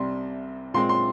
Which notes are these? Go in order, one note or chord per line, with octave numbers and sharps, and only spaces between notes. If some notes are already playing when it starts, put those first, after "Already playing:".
Already playing: C2 C3 G3 C6
A#2 G#3 C4 C6
C6